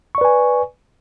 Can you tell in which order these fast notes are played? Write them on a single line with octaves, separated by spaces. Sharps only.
C#6 D5 B4 G#5